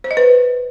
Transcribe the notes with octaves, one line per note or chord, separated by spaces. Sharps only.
C5
D#5
B4